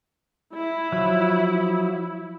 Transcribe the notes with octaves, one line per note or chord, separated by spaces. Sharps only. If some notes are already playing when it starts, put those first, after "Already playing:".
E4
F3 F#3 E6